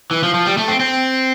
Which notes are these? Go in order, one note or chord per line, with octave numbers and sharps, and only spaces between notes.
E3
F3
F3
G3
A3
C4
C4